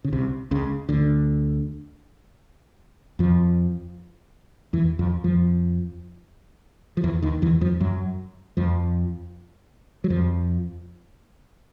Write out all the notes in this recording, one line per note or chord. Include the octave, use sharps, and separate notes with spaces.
C#3
C2 C3
C#2 C#3
D2 D3
F2 F3
E2 E3
F2 F3
F2 F3
F3
E2 E3
D#2 D#3
E2 E3
F2 F3
F#2 F#3
F2 F3
F#3
F2 F3